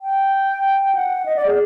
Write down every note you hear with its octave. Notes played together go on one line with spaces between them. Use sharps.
G5
F#5
D#5
D5
G#4